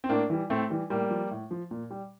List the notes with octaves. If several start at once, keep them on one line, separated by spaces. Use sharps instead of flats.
C4
A2 A#3 D4
E3 G3
A2 A3 C4
E3 G3
A2 G3 A#3
F3
A2
F3
A#2
G3